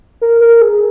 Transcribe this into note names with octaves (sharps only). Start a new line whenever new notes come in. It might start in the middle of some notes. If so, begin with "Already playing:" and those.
A#4
A#4
G#4